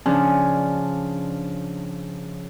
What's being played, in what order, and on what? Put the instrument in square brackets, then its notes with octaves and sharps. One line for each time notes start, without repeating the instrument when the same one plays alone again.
[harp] C#3 F3 C#4 D4